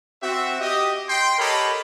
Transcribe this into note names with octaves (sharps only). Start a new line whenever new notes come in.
C4 F#4 E5
G4 D#5
G5 C6
G4 A4 A#4 C#5 D#5 B5